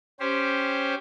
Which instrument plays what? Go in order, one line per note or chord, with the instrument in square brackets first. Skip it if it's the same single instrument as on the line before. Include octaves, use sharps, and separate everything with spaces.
[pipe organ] C#4 G4 C5